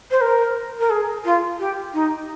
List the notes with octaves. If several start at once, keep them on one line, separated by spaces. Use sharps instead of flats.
C5
A#4
A#4
G#4
F4
G4
D#4